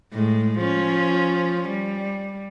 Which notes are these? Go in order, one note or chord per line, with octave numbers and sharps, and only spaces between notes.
A2 G#3
F3 C#4
G3